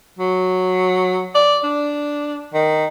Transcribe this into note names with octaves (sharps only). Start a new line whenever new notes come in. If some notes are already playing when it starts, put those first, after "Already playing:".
F#3
D5
D4
D#3